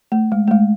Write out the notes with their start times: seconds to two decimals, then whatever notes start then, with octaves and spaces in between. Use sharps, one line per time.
0.12 A3
0.32 G#3
0.48 A3
0.51 G#3